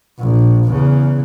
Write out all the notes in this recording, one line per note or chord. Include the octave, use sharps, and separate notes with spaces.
A#1
E2 C#3